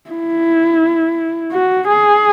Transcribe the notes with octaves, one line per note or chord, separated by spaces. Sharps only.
E4
F#4
G#4